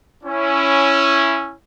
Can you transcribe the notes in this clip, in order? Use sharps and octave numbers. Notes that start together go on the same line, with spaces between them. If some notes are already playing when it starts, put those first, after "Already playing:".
C#4 E4